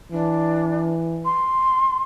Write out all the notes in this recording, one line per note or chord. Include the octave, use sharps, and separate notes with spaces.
E3 D4
C6